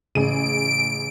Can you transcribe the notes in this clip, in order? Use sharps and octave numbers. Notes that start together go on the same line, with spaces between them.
A1 C#3 G#4 D7 D#7